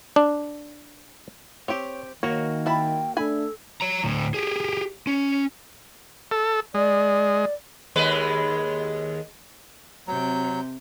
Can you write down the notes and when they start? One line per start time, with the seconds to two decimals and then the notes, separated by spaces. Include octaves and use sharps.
0.16 D4
1.68 C4 G4 C#5
2.23 D#3 A#3 F#4 C#5
2.66 E4 G5 A5 B5
3.17 A3 D4 A4 G#5 B5
3.81 C#5 A#5
4.04 D2 A2
4.34 G4 G#4
5.07 C#4
6.31 A4
6.74 G#3 D5
7.96 D#2 G#3 B4
10.07 C3 F#3 G6